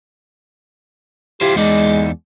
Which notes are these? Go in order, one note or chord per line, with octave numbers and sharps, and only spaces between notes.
E4 F4 G4 C5
E2 G#3 D#4 D5